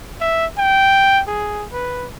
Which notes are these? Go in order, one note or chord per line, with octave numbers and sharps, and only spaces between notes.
E5
G5
G#4
B4